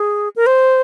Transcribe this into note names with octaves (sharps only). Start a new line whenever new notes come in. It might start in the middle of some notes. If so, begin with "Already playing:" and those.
Already playing: G#4
A#4
C5